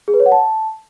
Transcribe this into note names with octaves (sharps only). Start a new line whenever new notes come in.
G#4
B4
C#5
F#5
A5